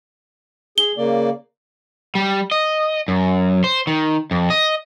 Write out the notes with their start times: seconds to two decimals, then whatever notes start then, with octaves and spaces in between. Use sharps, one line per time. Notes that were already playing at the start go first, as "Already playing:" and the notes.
0.78 G#4 G7
0.97 C#3 A#3 D5
2.15 G3
2.51 D#5
3.08 F#2
3.64 C5
3.87 D#3
4.31 F2
4.50 D#5